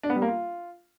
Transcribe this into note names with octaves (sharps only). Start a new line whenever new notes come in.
D4
B3
G3
A#3
F4